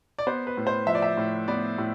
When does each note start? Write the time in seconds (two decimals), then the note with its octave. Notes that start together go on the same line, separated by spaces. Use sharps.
0.19 D5
0.27 B3 C5
0.47 B4
0.57 A2
0.67 C5
0.87 F3 E5
0.95 D5
1.02 E5
1.17 A2
1.48 B3 D5
1.78 A2